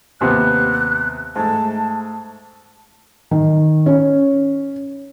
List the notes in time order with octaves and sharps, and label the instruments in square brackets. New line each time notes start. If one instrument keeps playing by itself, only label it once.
[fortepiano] D#2 C3 B3 [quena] F#6
[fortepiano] G#2 A3 [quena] A5
[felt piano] D#3
C#4